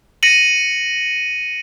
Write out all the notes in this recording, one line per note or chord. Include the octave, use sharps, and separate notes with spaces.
A#6 C#7 D#7 F#7